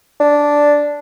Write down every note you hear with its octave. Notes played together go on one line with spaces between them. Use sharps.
D4